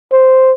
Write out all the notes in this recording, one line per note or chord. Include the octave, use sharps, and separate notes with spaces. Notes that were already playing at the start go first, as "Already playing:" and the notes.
C5